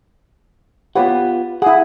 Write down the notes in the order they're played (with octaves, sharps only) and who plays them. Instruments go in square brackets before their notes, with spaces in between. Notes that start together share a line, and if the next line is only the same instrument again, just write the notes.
[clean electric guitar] B3 F4 F#5 [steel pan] G4 B4 C#5
[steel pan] E4 G#4 [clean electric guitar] F#5